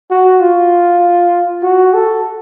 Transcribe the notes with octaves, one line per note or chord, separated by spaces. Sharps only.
F#4
F4
F#4
A4